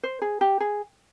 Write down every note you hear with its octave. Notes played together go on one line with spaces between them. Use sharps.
C5
G#4
G4
G#4